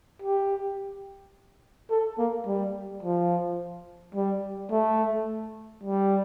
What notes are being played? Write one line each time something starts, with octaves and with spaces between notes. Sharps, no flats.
G4
A4
A#3
G3
F3
G3
A3
G3